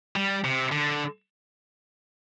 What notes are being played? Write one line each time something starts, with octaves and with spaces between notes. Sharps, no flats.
G3
C3
D3